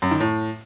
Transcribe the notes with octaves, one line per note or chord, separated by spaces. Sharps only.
F#2
D#3
A2